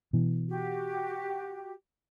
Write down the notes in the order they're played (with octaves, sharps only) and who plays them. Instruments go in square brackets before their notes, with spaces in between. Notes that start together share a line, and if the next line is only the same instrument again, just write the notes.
[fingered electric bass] B2 E3
[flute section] F#4 G4